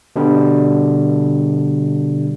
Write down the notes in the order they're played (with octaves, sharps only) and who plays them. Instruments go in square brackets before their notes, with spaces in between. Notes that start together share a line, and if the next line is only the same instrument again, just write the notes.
[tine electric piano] B2 D3 G3